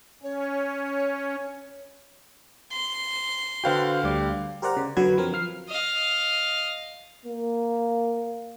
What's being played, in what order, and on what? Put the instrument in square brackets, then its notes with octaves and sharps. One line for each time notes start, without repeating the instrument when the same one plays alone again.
[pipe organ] C#4 [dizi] C#5
[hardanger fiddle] C6
[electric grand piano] D3 F5 G5 [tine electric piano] F#4 B4 C5
[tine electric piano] D2 G3 D6
[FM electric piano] G4 A#4 C5 D5 F#5 A#5
C#3
F#2 D3 F#3 F#4 B4 G#6
F3 C4 A#4
F3 F6 C7
[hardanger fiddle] D#5 F5
[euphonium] A#3